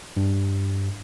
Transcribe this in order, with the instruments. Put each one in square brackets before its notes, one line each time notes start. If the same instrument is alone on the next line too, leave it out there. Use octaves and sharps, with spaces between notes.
[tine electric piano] G2